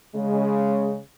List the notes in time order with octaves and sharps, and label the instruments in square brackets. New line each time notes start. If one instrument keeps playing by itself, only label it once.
[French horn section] C#3 G#3